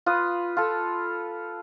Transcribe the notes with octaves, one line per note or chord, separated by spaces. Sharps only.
F4 B4 D#6
F4 A4